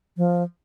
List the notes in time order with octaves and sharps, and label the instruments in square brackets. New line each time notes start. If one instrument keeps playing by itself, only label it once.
[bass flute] F3